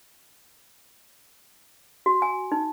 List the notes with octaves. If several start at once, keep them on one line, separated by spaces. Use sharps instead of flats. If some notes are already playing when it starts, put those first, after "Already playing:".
F#4
G#5
D#4